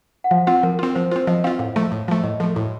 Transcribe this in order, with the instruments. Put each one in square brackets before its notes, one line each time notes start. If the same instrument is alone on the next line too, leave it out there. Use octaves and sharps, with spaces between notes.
[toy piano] F#5
[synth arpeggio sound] F3 [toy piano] F5
[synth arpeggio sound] C4 F4 [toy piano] F#5
[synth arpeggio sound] F3 [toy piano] A#4
[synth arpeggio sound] C4 F4 [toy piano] A#4
[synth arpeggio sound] F3 [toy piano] C5
[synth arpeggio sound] C4 F4 [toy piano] C5
[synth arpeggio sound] F3 [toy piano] D#5
[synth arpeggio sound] C4 F4 [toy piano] F5
[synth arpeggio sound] A2 [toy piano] F5
[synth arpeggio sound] F3 A3 [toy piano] F5
[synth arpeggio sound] A2
F3 A3
[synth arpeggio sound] A2 [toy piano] D#5
[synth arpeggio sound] F3 A3 [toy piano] A4
[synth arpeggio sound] A2 [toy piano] F#4